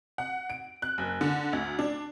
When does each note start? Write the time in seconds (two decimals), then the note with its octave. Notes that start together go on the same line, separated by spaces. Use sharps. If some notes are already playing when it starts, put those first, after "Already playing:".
0.18 F#5
0.50 D7
0.82 F#6
0.98 F#1
1.21 D3
1.53 D2
1.79 D4